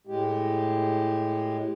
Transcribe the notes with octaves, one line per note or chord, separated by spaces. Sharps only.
A2 G#3 G4